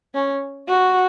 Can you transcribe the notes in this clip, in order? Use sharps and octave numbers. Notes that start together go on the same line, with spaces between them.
C#4
F#4